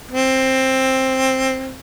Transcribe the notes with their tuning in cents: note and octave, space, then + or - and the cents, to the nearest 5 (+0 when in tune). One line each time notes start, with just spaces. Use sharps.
C4 +10